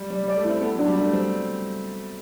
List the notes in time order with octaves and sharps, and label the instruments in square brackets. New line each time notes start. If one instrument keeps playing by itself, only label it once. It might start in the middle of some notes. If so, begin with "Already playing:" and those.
Already playing: [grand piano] G3
[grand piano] G3 [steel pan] D5
[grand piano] G3
[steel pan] D5
[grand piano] A3
[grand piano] C4 [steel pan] E4
[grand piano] B3 [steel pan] A4
[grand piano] F#3
[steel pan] D4
[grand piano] G3
[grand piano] A3 [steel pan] D4
[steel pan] G3 [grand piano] C4